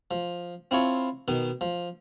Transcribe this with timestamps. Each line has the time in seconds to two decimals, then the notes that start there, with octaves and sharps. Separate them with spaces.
0.11 F3
0.71 C4 E4 F4 C#5 A5
1.28 B2 D#3
1.61 F3